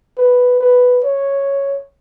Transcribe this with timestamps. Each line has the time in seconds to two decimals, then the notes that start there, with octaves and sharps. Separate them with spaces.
0.17 B4
0.60 B4
1.04 C#5